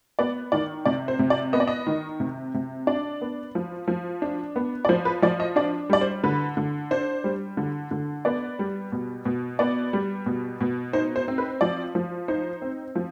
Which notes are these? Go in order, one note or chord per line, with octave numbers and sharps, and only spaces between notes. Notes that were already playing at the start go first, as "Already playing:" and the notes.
B3 D5
D#3 D5
C3 D5
C5
C3
D5
B3 D#5
D5
D#5
D#3
C3
C3
D4 D5
B3
F3
F3
D4
B3
D5
F3 C5
B4
F3 D5
D#5
D4 D5
G3 D5
C5
D3 B4
D3
D4 C5
G3
D3
D3
B3 D5
G3
B2
B2
B3 D5
G3
B2
B2
D#4 C5
C5
C4
B4
F3 D5
F3
D#4 C5
C4
F3